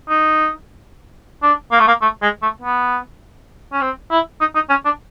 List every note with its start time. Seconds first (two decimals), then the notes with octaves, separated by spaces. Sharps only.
0.09 D#4
1.43 D4
1.72 A#3
1.80 A3
1.88 A#3
2.02 A3
2.22 G#3
2.42 A3
2.62 B3
3.72 C#4
3.81 C4
4.11 E4
4.40 D#4
4.55 D#4
4.70 C#4
4.85 D4